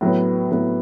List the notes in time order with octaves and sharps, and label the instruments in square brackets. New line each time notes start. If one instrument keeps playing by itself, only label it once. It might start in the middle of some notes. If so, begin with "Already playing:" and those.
[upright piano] A2 F#3 B3
A2 F#3 B3